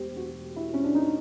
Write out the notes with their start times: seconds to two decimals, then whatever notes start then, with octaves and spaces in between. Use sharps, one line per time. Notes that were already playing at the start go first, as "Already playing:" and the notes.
Already playing: E1 E2 B2 G4 C5
0.17 F#4
0.56 E4
0.74 C#4
0.84 D4
0.95 D#4